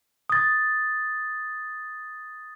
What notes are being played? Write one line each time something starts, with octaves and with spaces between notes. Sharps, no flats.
D#6 A6